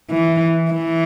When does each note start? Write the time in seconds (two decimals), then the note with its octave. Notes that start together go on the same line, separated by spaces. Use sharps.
0.11 E3
0.71 E3